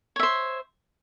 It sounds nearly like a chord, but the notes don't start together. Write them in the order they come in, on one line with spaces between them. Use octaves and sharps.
C#5 E5 C5